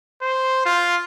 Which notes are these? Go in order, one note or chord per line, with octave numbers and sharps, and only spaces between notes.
C5
F4